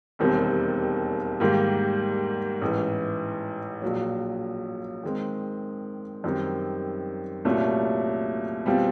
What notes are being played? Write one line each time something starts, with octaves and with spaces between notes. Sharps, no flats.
E1 D#2 D#3 G3 C4
G#2 D#3 G3 A#3
A1 G#2 E3
A#1 A#2 F#3
D#3 G#3 C4
F#2 D#3 G3 C4
C2 A#2 F#3 A3 C#4
B2 G3 C4 F4